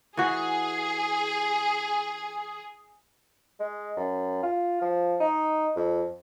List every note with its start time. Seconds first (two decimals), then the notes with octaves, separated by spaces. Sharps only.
0.17 E3 F#4 G#4
3.60 G#3
3.97 F#2
4.43 F4
4.81 F3
5.20 D#4
5.76 F2